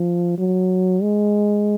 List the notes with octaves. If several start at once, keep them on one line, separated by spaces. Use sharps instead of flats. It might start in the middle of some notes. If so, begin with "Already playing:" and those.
Already playing: F3
F#3
G#3